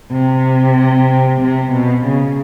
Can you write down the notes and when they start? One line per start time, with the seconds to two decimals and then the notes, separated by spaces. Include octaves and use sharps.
0.12 C3
1.41 C3
1.73 B2
2.05 C#3